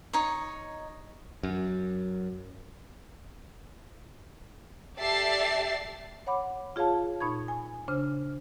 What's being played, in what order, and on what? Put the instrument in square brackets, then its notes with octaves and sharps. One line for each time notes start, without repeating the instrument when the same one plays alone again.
[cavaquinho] D#4 C#5
[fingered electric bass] F#2
[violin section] G4 A4 D5 E5 A6 C7
[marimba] C#5 F#5 B5 D6
F4 G#4 C#5 F5 A5
A#2 D#4 B5 C#6 G#6
G#5
C#3 D4 C5 F6